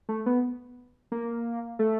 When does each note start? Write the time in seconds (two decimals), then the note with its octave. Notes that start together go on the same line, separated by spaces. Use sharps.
0.09 A3
0.26 B3
1.12 A#3
1.79 A3